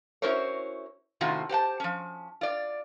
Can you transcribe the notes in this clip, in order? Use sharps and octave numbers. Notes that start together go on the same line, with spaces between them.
C#4 E4 F#4 A#4 C5 C#5
A2 C3 D#3 C#4 F4 F#4
G4 C5 F#5 A5
F3 C#4
F4 D5